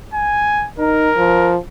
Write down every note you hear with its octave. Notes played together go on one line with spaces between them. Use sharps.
G#5
D#4 A#4
F3